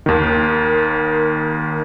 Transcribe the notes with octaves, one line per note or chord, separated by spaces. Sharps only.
D#2 D#3